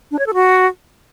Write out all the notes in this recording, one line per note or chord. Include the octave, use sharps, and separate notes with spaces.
D4
C#5
A4
F#4